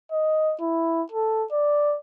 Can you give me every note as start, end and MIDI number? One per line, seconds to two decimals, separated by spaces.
0.12 0.55 75
0.61 1.02 64
1.12 1.45 69
1.52 1.96 74